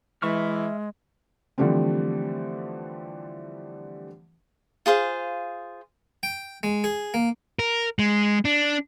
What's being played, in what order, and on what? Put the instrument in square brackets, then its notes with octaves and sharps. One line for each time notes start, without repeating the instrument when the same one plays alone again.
[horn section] E3 [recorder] G#3 [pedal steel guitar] E5 C#6 F6
[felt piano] D3 E3 F3 G3 A3 C4
[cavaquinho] F4 G#4 C5 F5
[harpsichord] G5
G#3
G#4
A#3
[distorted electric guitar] A#4
G#3
D4